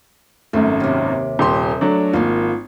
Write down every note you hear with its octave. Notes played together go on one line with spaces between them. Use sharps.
G#1 F#2 A3
D#2 C3
D#1 G4 C6
F#3 A3 D4
G#1 A#3 F4